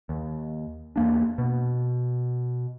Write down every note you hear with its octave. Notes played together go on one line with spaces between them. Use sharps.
D#2
E2 A#3 D4
B2